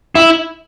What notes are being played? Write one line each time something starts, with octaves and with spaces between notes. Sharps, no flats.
E4